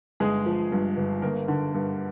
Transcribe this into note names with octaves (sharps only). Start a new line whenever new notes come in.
G1 G#3 G#4
F3
G2
G1
G1 A#3 A#4
D3
G2